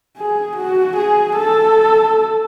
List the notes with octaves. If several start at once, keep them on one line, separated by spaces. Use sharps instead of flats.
G#4
F#4
G#4
A4